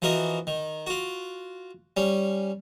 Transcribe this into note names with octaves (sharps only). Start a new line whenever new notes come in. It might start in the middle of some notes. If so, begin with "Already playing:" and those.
E3 F3 F#4 A#4 D#5
D#3
F4 F#4
G3 C#4